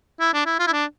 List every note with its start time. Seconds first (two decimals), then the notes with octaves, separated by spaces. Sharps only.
0.20 E4
0.34 D4
0.46 E4
0.59 F4
0.67 E4
0.72 D4